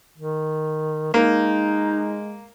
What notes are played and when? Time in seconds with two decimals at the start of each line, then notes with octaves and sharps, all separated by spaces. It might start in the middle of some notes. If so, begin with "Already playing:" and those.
0.18 D#3
1.14 G#3 A#3 D#4